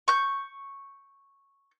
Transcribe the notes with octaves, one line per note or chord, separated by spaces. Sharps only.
C#6 G6